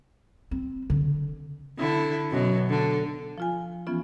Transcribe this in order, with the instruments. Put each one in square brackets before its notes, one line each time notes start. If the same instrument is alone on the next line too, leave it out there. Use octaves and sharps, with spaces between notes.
[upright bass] C4
D3
[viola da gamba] D3 E4
F#2 B2 F#3
D3
[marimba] F3 F4 G#5
E3 F3 B3 C#4 F4